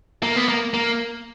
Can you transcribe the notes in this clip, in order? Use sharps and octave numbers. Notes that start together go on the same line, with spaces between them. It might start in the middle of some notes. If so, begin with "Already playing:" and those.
A#3
B3
A#3
A#3